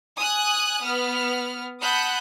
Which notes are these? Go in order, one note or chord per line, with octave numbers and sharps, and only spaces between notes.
G#5 D#6 F#6
B3 F6
F#5 A5 B5 D#6 F#6 G6